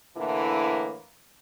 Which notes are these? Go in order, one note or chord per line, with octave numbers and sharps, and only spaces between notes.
A2 D3 E3 A#3 E4